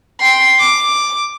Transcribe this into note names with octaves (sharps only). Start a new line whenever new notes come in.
G5 C6
D6